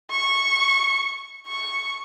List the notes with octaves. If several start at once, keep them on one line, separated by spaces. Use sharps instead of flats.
C#6
C#6